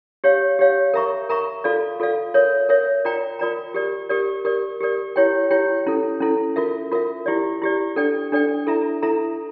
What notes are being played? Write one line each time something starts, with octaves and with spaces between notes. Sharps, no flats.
G4 C#5 F5
G4 C#5 F5
A#4 E5 A#5 C#6
A#4 E5 A#5 C#6
F4 A4 D5 F5
F4 A4 D5 F5
A#4 C#5 E5
A#4 C#5 E5
F4 A#4 D5 G5 A#5
F4 A#4 D5 G5 A#5
G4 A#4 D5
G4 A#4 D5
G4 A#4 D5
G4 A#4 D5
E4 G4 C#5 G5
E4 G4 C#5 G5
C#4 E4 A4
C#4 E4 A4
F4 A#4 E5
F4 A#4 E5
E4 G4 D5
E4 G4 D5
D4 A4 D5 G5
D4 A4 D5 G5
E4 A4 E5 A#5
E4 A4 E5 A#5